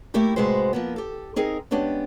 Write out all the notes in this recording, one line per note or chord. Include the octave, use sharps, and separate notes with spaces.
A3 A#3 E4 G4 A#4
A2 C3 G#3 F#4 B4 C5
F3 A#3 B3
G4 A4
C4 D#4 G#4 A#4
G#3 B3 C#4 D4 G4